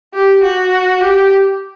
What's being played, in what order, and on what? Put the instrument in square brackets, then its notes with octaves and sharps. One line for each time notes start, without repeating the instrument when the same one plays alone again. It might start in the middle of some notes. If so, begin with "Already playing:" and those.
[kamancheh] G4
F#4
G4